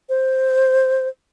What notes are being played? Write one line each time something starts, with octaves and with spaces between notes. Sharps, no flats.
C5